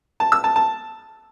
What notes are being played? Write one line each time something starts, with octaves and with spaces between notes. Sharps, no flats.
A5
E6
A5
A5